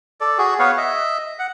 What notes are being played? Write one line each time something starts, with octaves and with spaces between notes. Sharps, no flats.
A4 D5
F#4 G#4
B3 B4 C#5 F5
D#5 E5
F#5